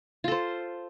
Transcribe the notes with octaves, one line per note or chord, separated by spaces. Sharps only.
F4 A4 C5